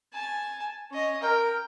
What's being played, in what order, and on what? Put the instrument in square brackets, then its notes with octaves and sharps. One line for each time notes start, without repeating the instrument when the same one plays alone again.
[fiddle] G#5 A5
C#4 D#5
[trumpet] A#4 [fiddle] G5